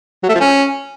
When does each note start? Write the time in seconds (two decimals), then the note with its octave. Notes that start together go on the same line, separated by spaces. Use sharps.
0.23 F#3
0.29 A3
0.35 F3
0.40 C#4